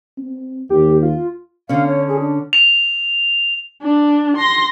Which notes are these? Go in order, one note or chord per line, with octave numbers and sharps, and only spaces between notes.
C4
D#2 G4
F4
D3 C#4 F5
C#5
G#4
D4
F7
D4
C6 A#6